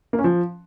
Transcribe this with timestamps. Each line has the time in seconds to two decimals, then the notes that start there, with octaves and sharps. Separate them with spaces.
0.13 A#3
0.19 C#4
0.24 F3